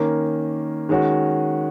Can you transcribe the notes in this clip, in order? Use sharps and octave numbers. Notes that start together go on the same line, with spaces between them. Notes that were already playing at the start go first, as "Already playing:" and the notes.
Already playing: D#3 A#3 C#4
D#3 G#3 C#4 F#4